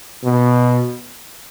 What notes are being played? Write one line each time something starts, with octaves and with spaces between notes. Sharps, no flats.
B2